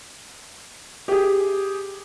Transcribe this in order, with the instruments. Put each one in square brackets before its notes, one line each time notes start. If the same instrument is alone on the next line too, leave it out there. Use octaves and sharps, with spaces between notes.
[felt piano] G4 G#4